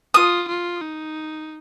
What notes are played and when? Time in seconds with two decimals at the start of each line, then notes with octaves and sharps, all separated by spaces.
0.14 F4 D#6
0.48 F4
0.81 D#4